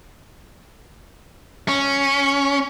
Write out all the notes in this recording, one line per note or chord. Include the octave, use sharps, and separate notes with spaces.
C#4